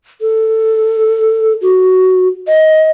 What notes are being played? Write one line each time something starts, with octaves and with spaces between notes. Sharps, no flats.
A4
F#4
D#5